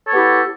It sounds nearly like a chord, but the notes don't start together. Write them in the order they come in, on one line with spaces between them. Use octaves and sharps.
A4 C#5 B3 G4 E4